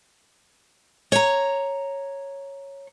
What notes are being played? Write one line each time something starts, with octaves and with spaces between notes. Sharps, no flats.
C#5 A#5